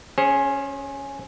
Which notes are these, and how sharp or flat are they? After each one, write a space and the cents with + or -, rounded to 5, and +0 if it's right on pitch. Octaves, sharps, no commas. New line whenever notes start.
C#4 +0 G#4 +0 C5 +40